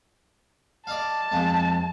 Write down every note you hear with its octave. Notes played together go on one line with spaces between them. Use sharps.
D5 D#5 F5 A5
F2 G#3